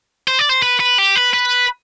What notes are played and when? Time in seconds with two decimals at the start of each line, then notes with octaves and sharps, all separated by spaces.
0.28 C5
0.39 D5
0.49 C5
0.62 B4
0.80 B4
0.98 G4
1.15 B4
1.33 B4